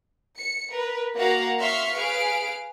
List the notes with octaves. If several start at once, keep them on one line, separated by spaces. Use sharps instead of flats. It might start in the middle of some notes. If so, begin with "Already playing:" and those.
C#7
A#4 B4
A#3 F#4 F5 F#5 A#5
E5 F5 C6 C#6 F6 B6
G#4 B4 F5 D7